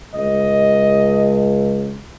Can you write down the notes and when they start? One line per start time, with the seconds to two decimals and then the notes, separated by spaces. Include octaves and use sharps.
0.14 C#2 D#5